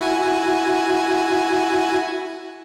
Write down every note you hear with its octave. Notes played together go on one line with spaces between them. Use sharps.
E4 F#4 G#5